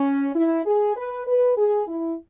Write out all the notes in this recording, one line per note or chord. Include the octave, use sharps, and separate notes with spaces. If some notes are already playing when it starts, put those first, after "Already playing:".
Already playing: C#4
E4
G#4
B4
B4
G#4
E4